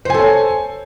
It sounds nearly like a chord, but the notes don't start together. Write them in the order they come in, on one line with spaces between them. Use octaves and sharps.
C5 G#5 A4 C#5